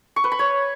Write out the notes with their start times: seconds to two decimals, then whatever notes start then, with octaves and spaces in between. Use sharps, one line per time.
0.16 C#6
0.24 B4
0.32 B5
0.39 C#5